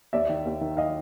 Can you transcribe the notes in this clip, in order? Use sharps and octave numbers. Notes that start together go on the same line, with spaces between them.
D#2 D5 E5
D#3
D#2
D#3
D#5 F5